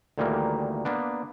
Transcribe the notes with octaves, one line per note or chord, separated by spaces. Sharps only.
D2 A#2 D#3 E3 G3 A#3
A#3 B3 D4